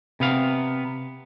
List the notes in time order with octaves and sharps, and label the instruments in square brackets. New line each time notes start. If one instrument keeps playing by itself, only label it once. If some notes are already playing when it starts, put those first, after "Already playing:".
[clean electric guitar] C3 B3 F5